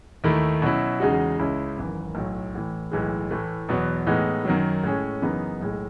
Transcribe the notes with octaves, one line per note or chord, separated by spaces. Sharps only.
D#2 D#3 A3 E4
B2 F#3 C#4 E4
E2 C#3 G#3 D#4 F#4
C#2 C#3 G#3 C#4 E4
G#1 F#2 E3
B1 A2 F#3
A1 A2 E3
B1 A2 E3 G#3
A2 E3 A3
E2 B2 F#3 B3
A2 E3 G#3 B3 D#4
F#2 D#3 F#3
A2 G#3 C#4 G#4
F#2 C#3 E3 B3 D#4
B1 A2 G#3